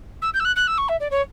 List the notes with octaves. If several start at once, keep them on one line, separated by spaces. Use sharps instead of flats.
E6
G6
E6
F#6
F#6
E6
C#6
E5
D5
C#5